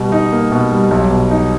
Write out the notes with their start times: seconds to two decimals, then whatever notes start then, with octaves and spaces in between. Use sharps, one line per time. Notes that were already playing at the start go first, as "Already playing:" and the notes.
Already playing: B2 G3
0.12 D#4
0.32 A#3
0.52 B2
0.71 G3
0.91 B1
1.11 B2
1.31 D#4